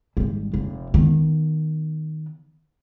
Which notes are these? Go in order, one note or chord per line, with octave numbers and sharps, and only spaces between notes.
G#1 G3
F1
D#3 B3